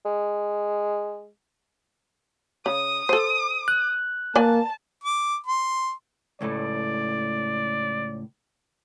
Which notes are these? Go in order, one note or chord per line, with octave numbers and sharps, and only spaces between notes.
G#3
C#3 D#6
A4 C5
F#6
A#3 B4 D5 G#5 A5
D6
C6
C#2 A2 A3 D5